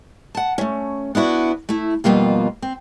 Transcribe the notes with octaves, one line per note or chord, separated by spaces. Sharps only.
F#5 A5
A3 C#4
B3 D4 E4 F#4
A3 E4
F2 B2 G3 A#3 F4
C4